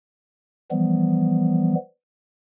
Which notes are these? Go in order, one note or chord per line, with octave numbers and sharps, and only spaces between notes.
E3 F3 G3 B3